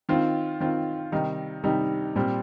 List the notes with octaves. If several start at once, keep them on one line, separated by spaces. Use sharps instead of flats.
D#3 C4 F4
D#3 C4 F4
C3 D#3 G3 D#4
C3 D#3 G3 D#4
A#2 G3 C4